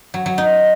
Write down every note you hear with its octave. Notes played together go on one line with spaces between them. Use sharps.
F#3
F#3
D#4